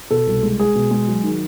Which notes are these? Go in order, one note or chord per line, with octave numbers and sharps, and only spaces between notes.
B2 A4
C2
G#3
G#3 G#4
B2
G#3
F#3
D#3